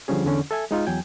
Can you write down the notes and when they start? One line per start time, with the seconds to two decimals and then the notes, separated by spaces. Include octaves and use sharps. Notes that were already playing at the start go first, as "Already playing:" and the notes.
0.08 D3 F3 G3 C#4 G#4
0.24 E2 D3 C#4
0.51 A4 E5 G#5
0.71 G#3 D#4 F4
0.86 E2 F#3 G5 G#5